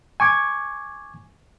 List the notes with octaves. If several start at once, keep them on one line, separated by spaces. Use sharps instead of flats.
G#5 C#6 D6 G#6